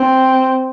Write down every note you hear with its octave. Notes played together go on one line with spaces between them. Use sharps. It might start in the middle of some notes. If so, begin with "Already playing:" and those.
Already playing: C4